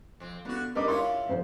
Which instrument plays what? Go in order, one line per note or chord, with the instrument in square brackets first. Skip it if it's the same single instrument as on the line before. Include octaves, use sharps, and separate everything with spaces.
[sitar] F2 C4
[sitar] D3 F#4 [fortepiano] B3
[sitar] G3 [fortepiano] A#4 D#5 D6
[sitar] C#3 E4 F4 [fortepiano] C6 C#6
[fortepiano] F2 C5